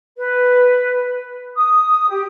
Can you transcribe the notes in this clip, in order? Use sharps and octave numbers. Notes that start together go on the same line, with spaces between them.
B4
D#6
G4